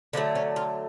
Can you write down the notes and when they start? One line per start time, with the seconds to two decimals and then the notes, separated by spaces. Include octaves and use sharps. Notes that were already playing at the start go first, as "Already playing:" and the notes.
0.13 D3 F#3 A3 B3
0.35 C#4
0.56 F4